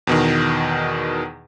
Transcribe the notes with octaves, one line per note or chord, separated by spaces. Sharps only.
E2 B2 D#3